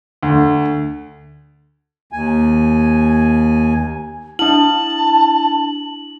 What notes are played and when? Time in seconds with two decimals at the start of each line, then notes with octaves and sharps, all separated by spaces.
0.23 D2
2.12 D#2 G#5
4.39 D4 E4 A5 F#7